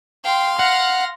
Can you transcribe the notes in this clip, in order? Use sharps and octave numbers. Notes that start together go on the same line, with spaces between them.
F5 G5 C6
F#5 F6 A#6